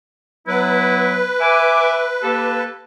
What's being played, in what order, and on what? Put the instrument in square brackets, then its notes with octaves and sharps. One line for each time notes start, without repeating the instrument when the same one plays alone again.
[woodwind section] F#3 B3 E4 [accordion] B4
[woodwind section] E5 G#5 D6
A#3 G4 A4